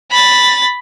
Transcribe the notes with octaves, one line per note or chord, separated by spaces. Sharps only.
B5 A6